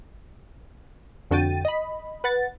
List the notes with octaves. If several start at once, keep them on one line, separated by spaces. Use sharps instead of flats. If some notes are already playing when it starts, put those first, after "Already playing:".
F2 D3 F#4 G5 A6 D#7
D#5 B5
B4 F#5 A6